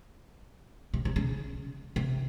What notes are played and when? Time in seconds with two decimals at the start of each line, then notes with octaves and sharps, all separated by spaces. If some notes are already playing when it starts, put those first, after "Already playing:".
0.94 C3
1.05 C3
1.16 C#3
1.96 C3